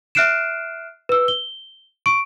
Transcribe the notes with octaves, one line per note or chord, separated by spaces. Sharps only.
E5 F6 F#6 C7 D7 E7
B4 E6
G7
C#6 D7